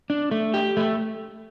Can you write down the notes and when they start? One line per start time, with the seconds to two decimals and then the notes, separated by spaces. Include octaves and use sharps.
0.10 D4
0.31 A3
0.54 G4
0.77 A3